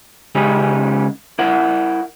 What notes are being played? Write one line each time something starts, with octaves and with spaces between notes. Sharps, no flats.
C#3 G#3 C#4 D#4 G4 G#4
E4 A#4 F#5